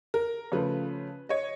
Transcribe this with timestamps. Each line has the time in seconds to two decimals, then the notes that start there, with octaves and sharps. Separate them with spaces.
0.14 A#4
0.52 C#3 F3 A3 B4
1.29 C#5 D#5